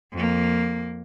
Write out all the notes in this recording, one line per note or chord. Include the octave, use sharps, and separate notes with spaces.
F2 A#3